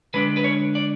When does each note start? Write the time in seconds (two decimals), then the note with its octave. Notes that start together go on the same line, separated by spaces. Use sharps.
0.14 D3 G#3 D4 B4
0.37 B4
0.44 C#5
0.75 D5